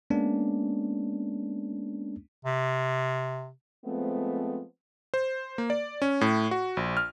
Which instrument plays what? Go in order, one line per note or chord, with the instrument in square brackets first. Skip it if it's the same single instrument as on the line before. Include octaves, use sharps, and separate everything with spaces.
[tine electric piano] G#3 A#3 B3 C#4 D4
[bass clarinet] C3
[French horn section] F3 G#3 A3 B3 C4
[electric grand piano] C5
A#3
D5
C#4
A2
F#4
A#1
F6